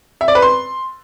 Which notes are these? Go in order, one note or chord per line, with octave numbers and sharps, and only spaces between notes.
E5
D5
B4
C6